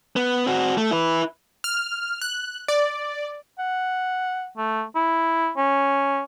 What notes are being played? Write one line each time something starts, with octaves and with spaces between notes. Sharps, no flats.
B3
C4 F#4
A3
E4 B4
F6
F#6
D5
F#5
A3
E4
C#4